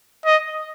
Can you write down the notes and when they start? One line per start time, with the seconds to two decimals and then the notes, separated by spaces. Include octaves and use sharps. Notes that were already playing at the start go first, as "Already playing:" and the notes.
0.25 D#5